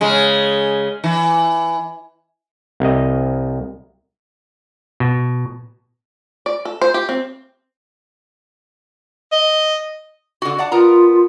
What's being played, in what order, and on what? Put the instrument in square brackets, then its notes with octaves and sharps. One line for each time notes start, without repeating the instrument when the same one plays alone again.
[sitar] C#3 G#3
E3
[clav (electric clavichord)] C2 D#5
B2
[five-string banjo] D5
A4
C5
G4
C4
[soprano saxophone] D#5
[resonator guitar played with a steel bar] D3 F#4
D5 F#5 A5
[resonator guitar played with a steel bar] B3 A#4 A#5 [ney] F4